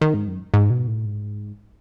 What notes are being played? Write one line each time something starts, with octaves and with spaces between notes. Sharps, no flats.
D#3
G#2
F#2
G#2
B2
A2
G#2